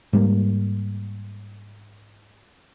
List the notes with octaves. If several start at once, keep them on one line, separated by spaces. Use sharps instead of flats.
G#2 G3 A#3